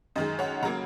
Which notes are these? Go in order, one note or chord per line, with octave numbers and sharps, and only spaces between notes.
F#2 D#3 G#3 D#5
C#5 F#5
C#3 F#3 A#3 F#5 A#5